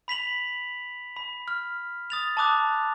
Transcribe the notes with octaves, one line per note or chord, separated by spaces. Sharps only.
B5 B6 F7 F#7
B5
F6
D#6 A6 F7
A5 B5 D6 D#6 F#6